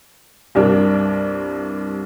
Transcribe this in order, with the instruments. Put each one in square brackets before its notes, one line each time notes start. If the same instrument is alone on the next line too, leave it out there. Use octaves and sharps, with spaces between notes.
[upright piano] C2 G2 D4 A#4